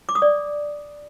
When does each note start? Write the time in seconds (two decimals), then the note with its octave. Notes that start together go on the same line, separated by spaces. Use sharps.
0.09 D6
0.15 D#6
0.22 D5